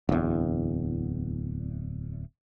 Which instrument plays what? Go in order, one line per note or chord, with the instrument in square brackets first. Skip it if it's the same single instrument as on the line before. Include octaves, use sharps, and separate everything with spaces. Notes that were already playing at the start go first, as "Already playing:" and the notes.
[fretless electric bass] D1 E2